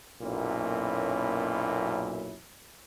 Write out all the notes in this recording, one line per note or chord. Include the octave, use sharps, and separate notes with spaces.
B1 F#2 A#2 A#3 C#4 E4